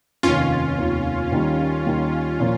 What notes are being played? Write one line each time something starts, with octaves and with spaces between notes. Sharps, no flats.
F1 D#2 D#3 C#4 F4
F1 D#2 D#3
D#2 D#3 G3 A#3
D#2 D#3 G3 A#3
A#2 F3 A#3 C#4